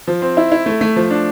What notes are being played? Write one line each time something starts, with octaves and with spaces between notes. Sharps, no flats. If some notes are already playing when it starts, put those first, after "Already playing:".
F3
C4
E4
E4
A3
A3
F3
D4